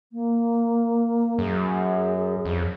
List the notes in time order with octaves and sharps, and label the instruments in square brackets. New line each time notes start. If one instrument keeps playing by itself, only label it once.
[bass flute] A#3
[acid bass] F#2 [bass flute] G#4
[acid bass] F2